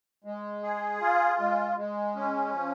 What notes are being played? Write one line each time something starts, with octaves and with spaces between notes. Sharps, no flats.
G#3
G#4
F4
G#3
G#3
C#4
F3